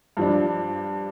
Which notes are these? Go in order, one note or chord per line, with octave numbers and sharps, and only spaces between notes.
G2 F3 D4